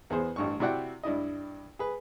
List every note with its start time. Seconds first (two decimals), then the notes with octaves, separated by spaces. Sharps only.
0.10 E2 B3 G#4 C5
0.36 A1 G2 C#6
0.60 C3 E4 F#4 D5 F#5 G5
1.03 G2 D4 E4 D#5
1.79 G#4 B4